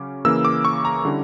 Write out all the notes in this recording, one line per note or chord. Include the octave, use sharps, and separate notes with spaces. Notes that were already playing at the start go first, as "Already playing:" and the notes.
Already playing: C#3 F#3 C#4 D6
C#3 E3 A#3 E6
D6
C#6
A#5
D3 G3 C#4 E4